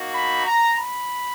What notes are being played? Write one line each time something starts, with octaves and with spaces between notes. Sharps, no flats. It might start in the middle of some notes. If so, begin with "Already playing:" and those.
Already playing: A#3 D#4 F#4
B5
A#5
B5